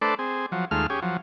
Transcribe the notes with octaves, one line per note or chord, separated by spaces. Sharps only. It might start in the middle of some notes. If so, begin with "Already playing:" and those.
A3 D4 A4 B4 C5 D5
C4 G#4
F3 F#3
D#2 G#3 A3 F4 F6
C#4 G4 G#4
F3 F#3